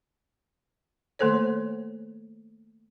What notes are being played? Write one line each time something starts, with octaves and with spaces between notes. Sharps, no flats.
D#3 A3 A#3 A4 C5 C#5